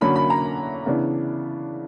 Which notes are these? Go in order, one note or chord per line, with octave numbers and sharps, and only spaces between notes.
D3 F#3 A#3 C#4 B5
B5
A#5
C#3 E3 B3 D4